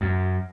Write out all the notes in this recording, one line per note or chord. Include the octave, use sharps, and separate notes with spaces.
F#2